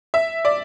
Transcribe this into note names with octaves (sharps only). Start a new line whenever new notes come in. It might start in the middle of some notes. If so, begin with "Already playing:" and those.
E5
D5